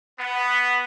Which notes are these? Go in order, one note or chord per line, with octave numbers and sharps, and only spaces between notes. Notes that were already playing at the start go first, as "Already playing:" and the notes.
B3